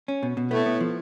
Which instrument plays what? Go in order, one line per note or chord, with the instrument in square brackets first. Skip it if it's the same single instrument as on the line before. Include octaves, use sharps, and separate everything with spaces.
[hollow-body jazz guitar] C#4
B2
B2
[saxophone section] A2 A3 [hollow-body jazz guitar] B3
[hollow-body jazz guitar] B3
F3